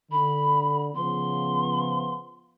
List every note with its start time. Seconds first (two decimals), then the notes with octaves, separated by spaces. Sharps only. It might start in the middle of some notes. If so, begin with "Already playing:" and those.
0.11 D3 B5
0.95 C#3 F3 B3 C6